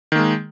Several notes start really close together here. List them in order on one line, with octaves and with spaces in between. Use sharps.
D#3 A#3 G#3